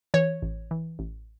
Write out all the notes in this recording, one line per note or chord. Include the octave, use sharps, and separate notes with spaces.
E3 C#5
A1
E3
A1